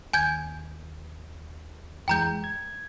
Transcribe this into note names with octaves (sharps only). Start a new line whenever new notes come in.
D#2 G#5 G6 G#6
F2 E3 G#3 G5 A#5 G6
G#6